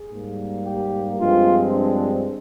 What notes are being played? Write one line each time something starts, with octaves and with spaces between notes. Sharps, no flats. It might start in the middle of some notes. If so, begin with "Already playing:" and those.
Already playing: G#4
G#2 G3 A#3
G4
G2 F3 G#3 C4 F4
D4